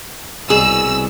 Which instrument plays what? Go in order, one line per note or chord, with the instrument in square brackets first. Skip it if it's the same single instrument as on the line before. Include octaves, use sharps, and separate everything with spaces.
[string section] C2 E6 [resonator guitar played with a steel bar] B2 G#4